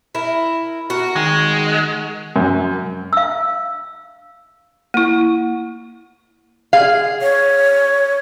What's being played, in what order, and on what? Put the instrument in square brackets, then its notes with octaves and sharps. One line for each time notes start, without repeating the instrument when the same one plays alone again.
[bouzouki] E4 A#4
F#4 A#4
[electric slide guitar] D#3 G#4 G5 [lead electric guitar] G#3
[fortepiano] F#2
[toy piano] F5 E6
[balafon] A#3 E4
[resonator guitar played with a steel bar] G#4 F5
[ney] C#5